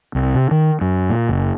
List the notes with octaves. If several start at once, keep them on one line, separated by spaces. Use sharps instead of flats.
C2
C3
D#3
F#2
A#2
F#1